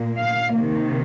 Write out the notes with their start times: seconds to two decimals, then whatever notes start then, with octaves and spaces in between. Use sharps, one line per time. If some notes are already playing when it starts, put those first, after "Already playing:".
Already playing: A#2 A#3
0.20 F5
0.51 C3 D#3 A#3